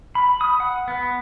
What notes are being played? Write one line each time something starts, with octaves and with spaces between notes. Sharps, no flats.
B5
D#6
F#5
B3